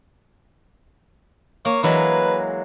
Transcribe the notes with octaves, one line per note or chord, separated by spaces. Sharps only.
A#3 C#5
E3 F#3 G#3 B4